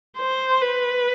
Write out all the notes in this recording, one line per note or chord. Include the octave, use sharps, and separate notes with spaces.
C5
B4